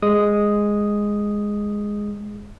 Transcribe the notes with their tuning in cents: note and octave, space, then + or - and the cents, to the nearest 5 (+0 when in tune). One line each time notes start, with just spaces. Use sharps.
G#3 -5 D#6 +0